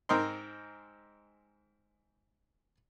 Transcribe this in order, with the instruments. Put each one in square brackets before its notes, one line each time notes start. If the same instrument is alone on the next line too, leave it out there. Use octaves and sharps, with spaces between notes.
[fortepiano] G#2 C4 A#4 D#5 C6